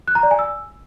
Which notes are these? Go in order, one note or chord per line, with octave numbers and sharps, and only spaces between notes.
F#6
A#5
D5
G#5
E6